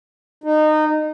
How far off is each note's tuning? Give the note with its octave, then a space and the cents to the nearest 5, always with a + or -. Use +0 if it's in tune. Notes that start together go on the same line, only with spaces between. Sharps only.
D#4 -20